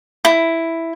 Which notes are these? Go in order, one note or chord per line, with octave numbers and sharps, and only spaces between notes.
E4